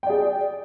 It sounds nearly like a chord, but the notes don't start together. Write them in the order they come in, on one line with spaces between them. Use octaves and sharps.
G5 D5 G#4